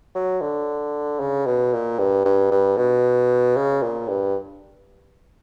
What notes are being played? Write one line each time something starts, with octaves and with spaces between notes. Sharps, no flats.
F#3
D3
C#3
B2
A#2
G2
G2
G2
B2
C#3
A#2
G2